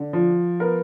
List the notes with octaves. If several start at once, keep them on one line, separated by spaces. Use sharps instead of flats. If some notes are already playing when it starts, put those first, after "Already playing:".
Already playing: D3
F3
B3 A#4